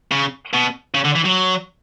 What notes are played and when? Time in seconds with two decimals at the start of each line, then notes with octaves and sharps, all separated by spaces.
0.12 C#3
0.54 B2
0.94 C#3
1.04 D3
1.15 E3
1.25 F#3